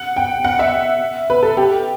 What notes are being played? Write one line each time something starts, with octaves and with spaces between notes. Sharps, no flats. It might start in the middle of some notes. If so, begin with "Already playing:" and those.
Already playing: F#5
G5
F#5
E5
B4
A4
G4